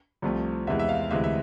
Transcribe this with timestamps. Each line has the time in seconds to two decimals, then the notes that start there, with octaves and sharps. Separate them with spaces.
0.22 C2 C3 F3 A3
0.67 E2 C3 E3 G#3 E5
0.79 E5
0.89 F5
1.11 D2 C3 E3 G#3 E5
1.24 E5